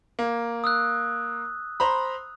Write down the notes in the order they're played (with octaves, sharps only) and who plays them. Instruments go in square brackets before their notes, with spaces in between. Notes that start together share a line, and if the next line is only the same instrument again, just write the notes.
[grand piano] A#3
[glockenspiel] D#6 E6 F#6
[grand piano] C5 A#5 B5